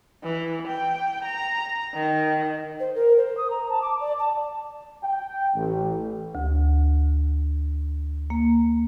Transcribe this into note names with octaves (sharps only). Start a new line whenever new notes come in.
E3
G5
A#5
D#3
C5
A#4
C5
D#6
A#5
A5
D6
D5
A5
G5
A1
D2
A#3